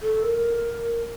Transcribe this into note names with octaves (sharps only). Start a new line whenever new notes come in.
A4
A#4